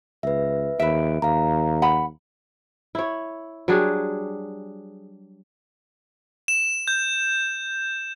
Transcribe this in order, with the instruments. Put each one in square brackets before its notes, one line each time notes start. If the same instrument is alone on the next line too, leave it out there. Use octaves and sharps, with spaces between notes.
[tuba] C#2 [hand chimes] B4 E5
[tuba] D#2 [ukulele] B4 E5 [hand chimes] D7
[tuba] D#2 [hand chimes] F5 A#5
[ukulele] F#5 B5
[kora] E4 C#5
F#3 G3 D4 G#4
[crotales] E7
G6